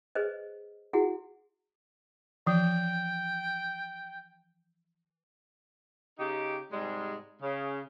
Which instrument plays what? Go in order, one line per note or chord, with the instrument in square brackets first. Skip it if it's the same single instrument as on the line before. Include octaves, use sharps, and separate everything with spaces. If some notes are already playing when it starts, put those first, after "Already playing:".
[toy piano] G#4 B4 C5 D#5
E4 F#4 G#4 F#5
[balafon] E3 F3 [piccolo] G5
[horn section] C#3 D#4 G4
G#2 C3 G3 G#3
C#3